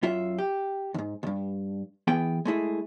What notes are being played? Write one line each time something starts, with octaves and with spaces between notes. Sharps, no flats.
F#2 F4 E5
G4
D#2 G#2
C#2 G2
E3 B3 G#4 G5
G#3 A3 E4 G#4